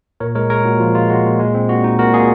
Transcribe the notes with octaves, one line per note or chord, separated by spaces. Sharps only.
A#2 A#4 C#5
G#3 A#4 C#5
G#3 A#4 C#5
A#2 F#4
F3 F4
G#3 F4
G#3 F#4
A#2
G#3
C4
A#2 F#4
D#4
A#2 F#4 A#4
A#2 F4 G#4